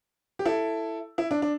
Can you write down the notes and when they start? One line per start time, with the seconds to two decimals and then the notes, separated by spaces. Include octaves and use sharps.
0.39 G4
0.45 E4 A4
1.18 E4
1.31 D4
1.42 D4